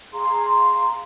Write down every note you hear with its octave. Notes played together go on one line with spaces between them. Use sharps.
G#4 F5 A#5 C6